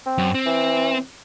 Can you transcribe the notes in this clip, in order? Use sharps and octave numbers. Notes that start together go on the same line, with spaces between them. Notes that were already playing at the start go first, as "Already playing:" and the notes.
C4
F#2
C4
E3